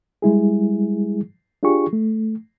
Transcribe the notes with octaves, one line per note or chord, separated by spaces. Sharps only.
G3 G#3 E4 G#4
D4 F4 G4 G#4 C#6
A3